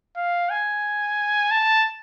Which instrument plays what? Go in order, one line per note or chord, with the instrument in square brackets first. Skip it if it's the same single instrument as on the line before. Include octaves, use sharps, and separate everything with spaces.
[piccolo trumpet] F5
G#5
A5